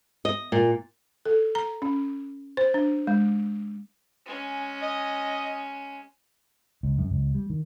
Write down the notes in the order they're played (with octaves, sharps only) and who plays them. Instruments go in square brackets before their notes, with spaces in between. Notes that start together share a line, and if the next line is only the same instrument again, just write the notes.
[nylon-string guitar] D#5
A#2
[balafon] A4
A#5
C#4
C5
D4
G#3
[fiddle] G#3 C#4
[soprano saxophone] D#5
[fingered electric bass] C#2
F#2
C#2
G3
D#3